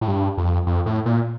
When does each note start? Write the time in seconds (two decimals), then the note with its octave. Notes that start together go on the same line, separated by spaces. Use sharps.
0.01 A2
0.08 G2
0.37 F2
0.67 F2
0.86 A2
1.06 A#2